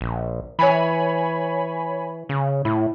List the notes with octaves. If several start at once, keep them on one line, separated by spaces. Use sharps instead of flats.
A#1
E3 C#5 G#5 B5
C#3
A2 E4